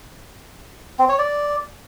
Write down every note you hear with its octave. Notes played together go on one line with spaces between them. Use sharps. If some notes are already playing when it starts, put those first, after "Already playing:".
C4
C#5
D5